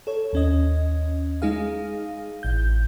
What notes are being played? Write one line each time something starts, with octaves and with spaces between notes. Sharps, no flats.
A4 C#5
D#2 C#4 D#5
G#3 D#4 G#4 F5
A1 G6